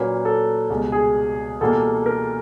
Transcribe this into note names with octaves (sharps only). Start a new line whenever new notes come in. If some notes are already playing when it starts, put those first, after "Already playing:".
Already playing: A#2 F#3 A#3 C#4 B4
A4
C#2 B2 G3
G#4
E2 B2 G3 A#3 A4
A#4